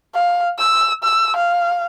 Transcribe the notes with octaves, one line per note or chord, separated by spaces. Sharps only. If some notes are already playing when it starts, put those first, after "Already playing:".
F5
E6
E6
F5